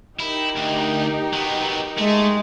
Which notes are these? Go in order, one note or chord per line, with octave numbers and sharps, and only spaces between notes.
D#4 E4 G4 A#4
D2
F#3 B3
G#3 A3